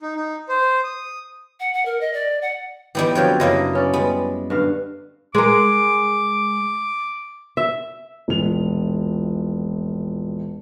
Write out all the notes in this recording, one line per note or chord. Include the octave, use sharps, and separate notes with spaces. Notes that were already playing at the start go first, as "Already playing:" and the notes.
D#4
D#4
C5
D#6
F#5
F#5
A#4
D#5
D5
F#5
E3 G3 B3 D#4 G4
F2 D3 F3 F#3 C#5 G5
F#2 C#3 A#3 D4 E4 D#5
B3 C#4 D5
G3 G#3 B3
G2 D3 F5
G#3 A#4 D6
E5
E1 A#1 F7